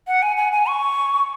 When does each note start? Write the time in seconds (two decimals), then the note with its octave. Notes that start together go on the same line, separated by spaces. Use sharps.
0.07 F#5
0.22 G#5
0.37 G#5
0.52 G#5
0.68 C#6